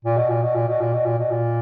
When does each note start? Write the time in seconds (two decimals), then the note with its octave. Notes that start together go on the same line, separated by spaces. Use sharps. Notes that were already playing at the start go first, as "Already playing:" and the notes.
0.05 A#2
0.17 B2
0.30 A#2
0.42 B2
0.55 A#2
0.68 B2
0.81 A#2
0.94 B2
1.06 A#2
1.19 B2
1.31 A#2